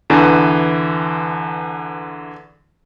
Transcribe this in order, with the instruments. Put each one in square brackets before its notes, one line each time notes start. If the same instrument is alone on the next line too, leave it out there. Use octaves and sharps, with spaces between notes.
[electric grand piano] E2 D3 E3